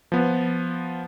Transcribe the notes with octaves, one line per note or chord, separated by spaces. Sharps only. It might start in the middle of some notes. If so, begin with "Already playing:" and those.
F3 B3